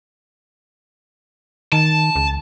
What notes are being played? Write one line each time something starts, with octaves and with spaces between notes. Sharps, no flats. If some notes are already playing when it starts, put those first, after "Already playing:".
D#3 A5
C#2